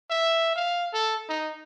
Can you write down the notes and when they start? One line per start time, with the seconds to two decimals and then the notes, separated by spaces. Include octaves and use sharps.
0.11 E5
0.56 F5
0.94 A4
1.29 D#4